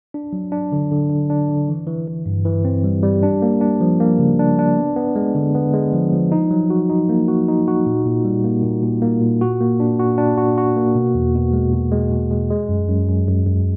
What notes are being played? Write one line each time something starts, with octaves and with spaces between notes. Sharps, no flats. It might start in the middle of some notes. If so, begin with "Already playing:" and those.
D4
F#3
D4
D3
D3
D3
D4
D3
E3
E3
E3
G2
E3
C4
G3
G3
D4
A#3
D4
F3
A#3
C#3
D4
D4
B3
B3
G#3
D3
B3
G#3
F3
F3
D#4
F#3
F#4
D#4
A#3
F#4
D#4
F#4
A#2
A#2
G3
A#3
A#2
A#2
A#3
A#2
F#4
A#3
D4
F#4
D4
F#4
F#4
A#3
B2
E2
B2
G#3
B2
G#3
B2
G#3
G#3
F#2
F#2
F#2
F#2
F#2